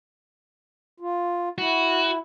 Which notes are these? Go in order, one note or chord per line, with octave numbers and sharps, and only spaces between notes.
F4
E4 F#4